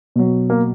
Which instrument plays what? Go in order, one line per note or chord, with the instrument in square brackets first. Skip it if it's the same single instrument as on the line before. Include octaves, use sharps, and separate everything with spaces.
[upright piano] B2 F#3
A#3